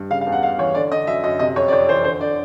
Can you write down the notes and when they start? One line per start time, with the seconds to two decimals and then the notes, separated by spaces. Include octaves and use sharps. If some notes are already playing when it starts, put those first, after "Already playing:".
Already playing: G2
0.10 C#3 F5
0.21 F5
0.26 E2
0.32 F#5
0.43 E2 F5
0.58 E3 C#5
0.75 D3 D5
0.92 D3 D#5
1.07 F#2 E5
1.23 F#2 D#5
1.39 C3 D#5
1.56 F2 C#5
1.68 D5
1.72 F2 C#5
1.89 E3 C5
2.04 D3 C5
2.21 D3 D5